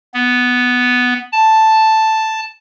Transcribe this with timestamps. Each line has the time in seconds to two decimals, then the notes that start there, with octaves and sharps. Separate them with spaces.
0.14 B3
1.32 A5